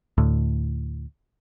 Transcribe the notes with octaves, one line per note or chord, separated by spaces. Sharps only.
D2 A2